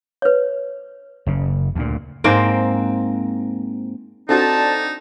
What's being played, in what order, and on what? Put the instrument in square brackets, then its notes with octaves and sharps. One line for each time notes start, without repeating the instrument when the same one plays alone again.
[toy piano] B4 C#5
[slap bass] F#1 C#3
D2 A#2
[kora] G#2 A#3 C4 G5
[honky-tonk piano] C4 D4 F#4 [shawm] D#4 [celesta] A4 [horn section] C5 A5